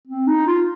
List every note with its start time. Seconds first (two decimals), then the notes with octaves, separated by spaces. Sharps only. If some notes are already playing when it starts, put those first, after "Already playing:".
0.07 C4
0.27 D#4
0.47 F4